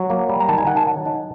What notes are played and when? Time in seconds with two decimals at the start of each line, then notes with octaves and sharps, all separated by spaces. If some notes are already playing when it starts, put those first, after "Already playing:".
Already playing: F#3
0.10 A#3
0.29 G3
0.40 A#5
0.49 D#3 A5
0.58 G#5
0.67 D#3 F#5
0.77 A5
0.87 F#3
1.06 D#4